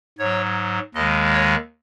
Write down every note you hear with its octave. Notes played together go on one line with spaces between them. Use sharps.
G#2 F#3 C#5
D#2 D#3 G#3 D#5
C#5